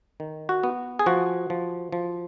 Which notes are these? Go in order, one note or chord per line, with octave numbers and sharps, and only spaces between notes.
D#3
F#4
B3
G#4
F3 F#4
F3
F3